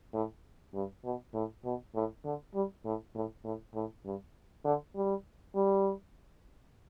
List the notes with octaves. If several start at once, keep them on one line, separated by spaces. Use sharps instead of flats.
A2
G2
B2
A2
B2
A2
D3
G3
A2
A2
A2
A2
G2
D3
G3
G3